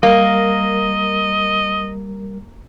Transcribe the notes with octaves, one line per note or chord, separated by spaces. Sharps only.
G3 A#3 A#4 D#5